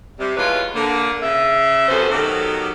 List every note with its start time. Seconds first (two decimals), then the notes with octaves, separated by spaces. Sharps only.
0.19 C3 G3
0.36 E2 F3 G#3 F4 B4 C#5
0.75 D3 A#3
1.22 C#3 E5
1.89 F#2 C3 B3 C#4 A4 C5
2.10 B2 D#3 F#3 G4 A4